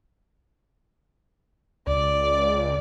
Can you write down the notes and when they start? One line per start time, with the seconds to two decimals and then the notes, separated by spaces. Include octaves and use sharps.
1.87 C#2 D5